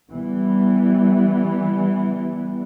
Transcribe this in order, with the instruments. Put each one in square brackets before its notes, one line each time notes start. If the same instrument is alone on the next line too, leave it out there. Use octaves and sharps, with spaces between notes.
[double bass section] E3 G3 B3